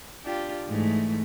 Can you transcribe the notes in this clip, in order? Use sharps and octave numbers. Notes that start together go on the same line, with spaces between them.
D4 F4 G4
G#2 E3 A3